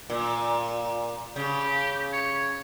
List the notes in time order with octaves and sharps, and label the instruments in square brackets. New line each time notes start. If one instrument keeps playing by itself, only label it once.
[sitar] A#2
[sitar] C#3 [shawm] G4
[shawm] C#5